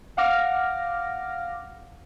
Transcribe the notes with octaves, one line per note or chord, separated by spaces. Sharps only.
F5 F#5 D6 F6 A#6